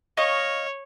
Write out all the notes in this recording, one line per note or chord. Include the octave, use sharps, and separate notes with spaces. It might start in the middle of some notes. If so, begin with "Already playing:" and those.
C#5 D#5 F5 C#6